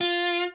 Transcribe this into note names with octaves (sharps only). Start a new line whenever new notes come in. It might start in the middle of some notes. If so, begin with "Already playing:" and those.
F4